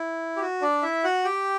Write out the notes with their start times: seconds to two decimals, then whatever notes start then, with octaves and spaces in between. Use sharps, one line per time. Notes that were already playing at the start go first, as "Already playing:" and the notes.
Already playing: E4
0.36 G4
0.41 F#4
0.62 D4 D5
0.83 E4 E5
1.04 F#4 F#5
1.25 G4 G5